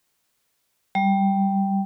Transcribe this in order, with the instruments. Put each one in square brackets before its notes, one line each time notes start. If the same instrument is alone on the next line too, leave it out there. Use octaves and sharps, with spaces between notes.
[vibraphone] G3